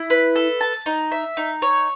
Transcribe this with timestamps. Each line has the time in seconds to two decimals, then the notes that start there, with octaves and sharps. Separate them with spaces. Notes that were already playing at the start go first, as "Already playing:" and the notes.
Already playing: E4
0.10 B4
0.35 A4
0.61 A5
0.86 D#4
1.11 E5
1.37 D#4
1.62 C#5